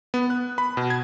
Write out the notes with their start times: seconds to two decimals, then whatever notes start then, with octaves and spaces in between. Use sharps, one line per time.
0.14 B3
0.30 F#6
0.58 B5
0.77 B2
0.90 G#6